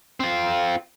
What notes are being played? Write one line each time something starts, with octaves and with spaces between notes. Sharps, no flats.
C4 F4